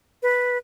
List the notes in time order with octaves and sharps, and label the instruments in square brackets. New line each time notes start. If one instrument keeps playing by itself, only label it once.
[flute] B4